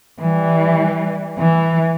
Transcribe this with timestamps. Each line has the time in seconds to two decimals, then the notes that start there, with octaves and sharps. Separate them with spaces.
0.21 E3 G3
1.39 E3